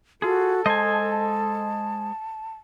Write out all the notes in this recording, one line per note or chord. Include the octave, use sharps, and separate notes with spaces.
F4 F#4 G#4 A4
G#3 C5 D#5 G#5 A5